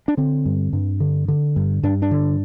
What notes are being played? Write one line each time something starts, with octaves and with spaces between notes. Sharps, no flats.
D4
D3 C4
G2
G2
D3
D3
G2
G2 D4
D4
D3